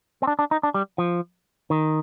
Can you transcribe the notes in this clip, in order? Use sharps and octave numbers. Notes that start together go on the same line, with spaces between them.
C4
D4
D4
D#4
D4
G3
F3
D#3